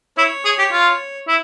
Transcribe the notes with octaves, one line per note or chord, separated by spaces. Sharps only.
E4 C#5
G#4
G4
F4
E4